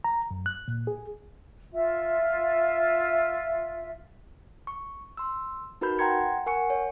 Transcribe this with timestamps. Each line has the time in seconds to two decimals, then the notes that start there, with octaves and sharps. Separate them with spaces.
0.04 A#5
0.31 F#2
0.46 F#6
0.68 A#2
0.87 G#4
1.73 F4 E5
4.67 C#6
5.17 C6 E6
5.81 D#4 F#4 A#4 B4 B5 G6
5.98 F#5 G5 A#5 C6 G#6 C#7
6.47 A#4 F#5 G#5 C#6 C#7
6.70 C#5